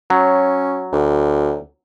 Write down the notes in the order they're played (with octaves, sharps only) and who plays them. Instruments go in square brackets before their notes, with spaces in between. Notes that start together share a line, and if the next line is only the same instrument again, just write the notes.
[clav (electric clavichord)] F#3 [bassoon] C#4
[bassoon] D2